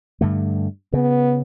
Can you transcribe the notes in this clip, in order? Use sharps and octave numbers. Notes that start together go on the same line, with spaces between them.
G2 D3 A3
C#3 B3